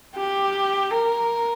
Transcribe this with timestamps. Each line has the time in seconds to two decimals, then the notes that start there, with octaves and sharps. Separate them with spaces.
0.16 G4
0.91 A#4